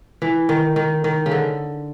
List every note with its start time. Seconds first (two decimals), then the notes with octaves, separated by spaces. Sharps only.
0.22 E3
0.49 D#3
0.76 D#3
1.04 D#3
1.26 C#3
1.31 D3